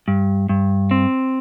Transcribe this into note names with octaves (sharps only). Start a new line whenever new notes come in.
G2
G2
C4